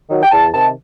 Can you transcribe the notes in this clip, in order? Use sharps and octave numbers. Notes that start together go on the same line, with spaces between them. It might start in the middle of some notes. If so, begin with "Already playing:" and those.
D#3 F#3
G5
E2 A5
C3 D#3 A5